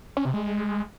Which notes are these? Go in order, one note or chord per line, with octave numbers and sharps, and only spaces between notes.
C#4
C3
G#3